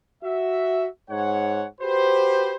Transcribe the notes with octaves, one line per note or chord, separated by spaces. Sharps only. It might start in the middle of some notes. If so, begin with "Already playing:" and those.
F#4 E5
G#2 C#5 F#5
F#4 G4 B4 C5